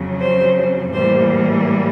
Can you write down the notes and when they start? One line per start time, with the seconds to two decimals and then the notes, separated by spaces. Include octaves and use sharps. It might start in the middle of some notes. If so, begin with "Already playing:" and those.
Already playing: F2 C#3 F#3
0.20 C5
0.93 A2 E3 G3 A#3 C5